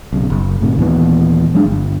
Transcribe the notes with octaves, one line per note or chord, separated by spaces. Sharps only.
B1 C#3
F#1
A2 C3 D#3
D#2 A#2 E3 B3
F#3 G#3 D4
G1